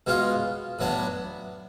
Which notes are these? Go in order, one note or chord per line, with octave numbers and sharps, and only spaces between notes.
B2 G#3 C#4 F4
A2 F#3 B3 D4